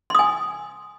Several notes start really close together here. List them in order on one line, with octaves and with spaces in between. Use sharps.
C6 D#6 G#5